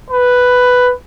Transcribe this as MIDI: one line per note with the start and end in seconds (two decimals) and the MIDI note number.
0.11 0.91 71